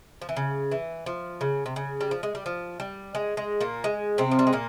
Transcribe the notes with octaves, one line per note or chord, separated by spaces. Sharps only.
F3
E3
C#3
E3
F3
C#3
C3
C#3
G3
F3
G#3
G3
F3
G3
G#3
G#3
A#2 A#3
G#3
C3 C4
F3
G3
G#3
A#2 A#3